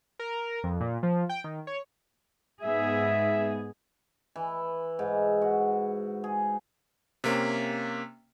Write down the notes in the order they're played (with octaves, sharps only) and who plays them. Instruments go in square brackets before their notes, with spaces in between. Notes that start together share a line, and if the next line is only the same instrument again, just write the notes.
[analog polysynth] A#4
F2
A#2
F3
G5
D#3
C#5
[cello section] G#2 B3 G#4 [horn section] E5
[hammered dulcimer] E3
G#2
F#4
G#4
[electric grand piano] C3 A#3 C#4